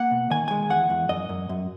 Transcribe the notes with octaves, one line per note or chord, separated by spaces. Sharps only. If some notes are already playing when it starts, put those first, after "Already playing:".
Already playing: A#3 F#5
B2
D#3 G#5
G#3 G#5
E2 F#5
E2
F#2 D#5
F#2
F#2